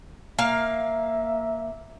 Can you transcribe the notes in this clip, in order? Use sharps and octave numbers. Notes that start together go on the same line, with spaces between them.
A#3 E5 F5